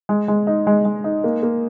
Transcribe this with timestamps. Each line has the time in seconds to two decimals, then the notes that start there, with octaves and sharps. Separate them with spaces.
0.09 G#3
0.28 G#3
0.47 D#4
0.67 G#3
0.85 G#3
1.04 D#4
1.24 A#3
1.43 A#3